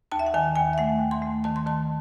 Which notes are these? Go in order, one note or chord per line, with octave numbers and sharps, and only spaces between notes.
D#2 A5
E5
F#5
D#3 G#5
D#2 G#5
E5
A3 F#5
D#2
C6
A3
D#3 A5
C6
D#3 A5